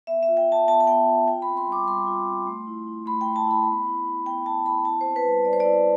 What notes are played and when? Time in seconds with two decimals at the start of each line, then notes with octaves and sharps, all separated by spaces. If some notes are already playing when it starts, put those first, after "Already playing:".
0.07 B3 E5
0.23 E5
0.28 F4
0.37 G5
0.47 F4 A5
0.68 B3 A5
0.80 A5
0.87 B3 G5
1.07 F4
1.28 F4 G5
1.42 B5
1.48 C4
1.57 C6
1.67 G3
1.72 D6
1.87 G3 C6
2.07 F4
2.26 C4
2.47 A3
2.67 E4
2.87 E4
3.06 A3 B5
3.21 G5
3.26 A3
3.36 A5
3.47 E4 B5
3.67 B3
3.87 E4
4.06 E4
4.26 B3 G5
4.45 B3 A5
4.66 E4 B5
4.85 E4 A5
5.01 C4 C5
5.16 B4
5.26 G3
5.45 G3 D5
5.53 C5
5.60 E4 D5